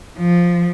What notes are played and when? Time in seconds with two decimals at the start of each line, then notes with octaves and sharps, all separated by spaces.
0.17 F3